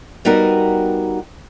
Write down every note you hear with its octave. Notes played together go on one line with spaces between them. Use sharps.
G3 B3 D#4 F#4 A#4